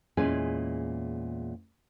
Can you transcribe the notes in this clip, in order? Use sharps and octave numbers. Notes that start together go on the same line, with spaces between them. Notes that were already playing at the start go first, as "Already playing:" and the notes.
E2 A#2 G#3 C#4 G#5